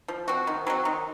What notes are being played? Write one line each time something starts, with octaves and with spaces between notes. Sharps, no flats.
F3
C4 F#4
D#3
F#3 C4 F#4
D#3